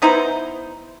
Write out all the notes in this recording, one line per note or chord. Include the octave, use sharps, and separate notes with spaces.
B3 D#4 E4 C5